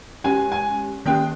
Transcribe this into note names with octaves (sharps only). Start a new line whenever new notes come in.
G#3 C#4 G4 G#5
G#5
D#3 A#3 C#4 G4 G5